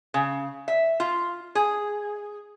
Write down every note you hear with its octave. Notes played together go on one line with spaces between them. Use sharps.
C#3
E5
F4
G#4